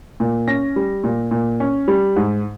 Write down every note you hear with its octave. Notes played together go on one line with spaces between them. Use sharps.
A#2
C#4 A#6
G3
A#2
A#2
C#4
G3
G#2